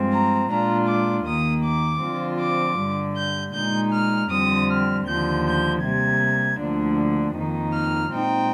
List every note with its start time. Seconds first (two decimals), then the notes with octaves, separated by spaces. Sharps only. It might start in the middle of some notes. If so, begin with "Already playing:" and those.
Already playing: G2 F3 G#3 C4
0.12 A#5
0.50 A#2 G#3 D4 F4 A#5
0.88 D6
1.26 D#2 D#3 A#3 D#6
1.64 D6
2.02 D3 F3 C4 F4
2.40 D6
2.79 G2 D3 G3
3.16 G6
3.54 A#2 G#3 D#4 G6
3.92 F6
4.31 F2 D3 G3 C4 D#6
4.70 F6
5.07 D#2 D3 F3 G6
5.46 G6
5.83 C3 G3 A#3 G#6
6.59 D2 D3 F3 A#3 D4
7.35 F2 D#3 A#3 D#4
7.73 F6
8.12 A#2 G#3 C4 D#4 G5